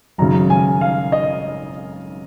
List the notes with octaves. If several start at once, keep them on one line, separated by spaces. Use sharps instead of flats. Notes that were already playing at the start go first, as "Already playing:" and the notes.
G#1 F#2 C#3 A#5
G#5
F5
D#5